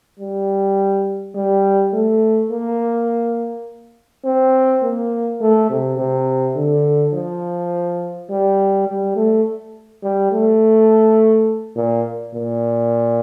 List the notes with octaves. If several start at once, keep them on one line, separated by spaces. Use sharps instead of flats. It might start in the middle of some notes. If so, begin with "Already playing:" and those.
G3
G3
A3
A#3
C4
A#3
A3
C3
C3
D3
F3
G3
G3
A3
G3
A3
A#2
A#2